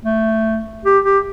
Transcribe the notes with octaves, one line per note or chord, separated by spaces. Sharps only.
A3
G4
G4